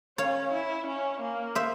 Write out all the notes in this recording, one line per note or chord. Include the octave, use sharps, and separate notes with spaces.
C#4 C#5 F5
E4
C#4
A#3
C5 E5